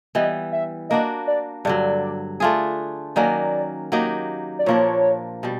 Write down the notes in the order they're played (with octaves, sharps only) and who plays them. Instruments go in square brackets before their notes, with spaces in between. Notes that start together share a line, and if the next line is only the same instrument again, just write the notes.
[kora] E3 G3 B3 [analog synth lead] D#5
[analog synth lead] E5
[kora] A#3 D4 F#4 [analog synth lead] D#5
[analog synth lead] D5
[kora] G2 D3 F#3 [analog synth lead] D5
[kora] A3 D4 F4 G#4
[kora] D#3 F#3 A#3 C#4 [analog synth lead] D5
[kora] F#3 A#3 D#4 G4
[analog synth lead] D5
[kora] A#2 F3 A#3 D4 [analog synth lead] C#5
[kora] B2 G3